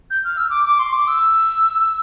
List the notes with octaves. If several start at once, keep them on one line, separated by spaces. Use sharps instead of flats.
G6
F6
E6
D6
D6
C6
D6
E6